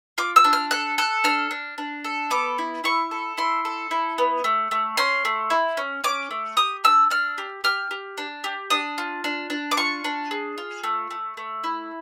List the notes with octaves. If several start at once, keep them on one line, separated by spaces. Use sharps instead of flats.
F4 D6
E6
D4
F6
A4 F#6
A4 F#6
D4 F6
D4
D4
A4
B3 D6
E4
E4 C#6
A4
E4 C6
A4
E4
B3
A3
A3
C#4 C6
A3
E4
C#4
C#4 D6
A3
G4 D#6
D4 E6
D4 F6
G4
G4 F6
G4
D4
G4
D4 D#6
F4
D4
D4
D6
F4 C#6
D4
G#4
F4
A3
A3
A3
E4